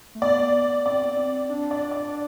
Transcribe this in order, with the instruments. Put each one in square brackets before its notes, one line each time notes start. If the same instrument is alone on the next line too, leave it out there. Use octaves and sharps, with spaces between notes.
[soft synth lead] A3
[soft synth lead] B3 [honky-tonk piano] D5
[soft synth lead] C4 [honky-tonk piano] D5
[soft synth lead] C4
D4
[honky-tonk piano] D5
D5